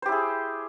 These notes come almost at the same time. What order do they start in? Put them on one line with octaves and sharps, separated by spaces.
C5 G4 E4 G#4